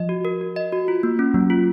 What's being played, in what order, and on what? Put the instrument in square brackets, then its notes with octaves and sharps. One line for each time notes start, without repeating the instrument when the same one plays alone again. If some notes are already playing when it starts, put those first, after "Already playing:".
Already playing: [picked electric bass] F3 [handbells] D#5
[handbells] F#4
A#4
F#4
D#5
F#4
F4
A#3
C#4
[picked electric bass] F#3 [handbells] A#3
[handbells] F4